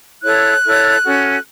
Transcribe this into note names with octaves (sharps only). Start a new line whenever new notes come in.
E4 A4 C#5 F#6
E4 A4 C#5
C#4 F#4 A4